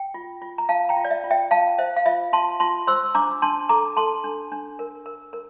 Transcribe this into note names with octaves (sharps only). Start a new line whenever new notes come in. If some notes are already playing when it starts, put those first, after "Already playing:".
Already playing: G5
F4
F4
A#5
F4 F5 A5
G5 A#5
F4
D5
E5
F4
E5 G5
F4 F5 A5
C5 E5
F5
F4 E5
F4 A5 C6
F4 A5 C6
C5 C6 E6
D4 A#5 D6
D4 A5 C6
A4 A#5 D6
A4 A5 C6
D4
D4
A#4
A#4
A#4